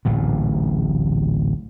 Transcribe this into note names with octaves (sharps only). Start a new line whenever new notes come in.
D1 A1 A#2